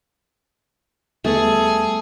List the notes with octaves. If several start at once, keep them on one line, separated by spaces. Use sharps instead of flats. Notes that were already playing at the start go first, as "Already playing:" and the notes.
D#2 G3 A3 B3 G#4